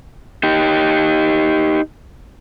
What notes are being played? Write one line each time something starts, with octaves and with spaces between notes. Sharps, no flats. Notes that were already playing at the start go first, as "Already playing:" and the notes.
D#4 G4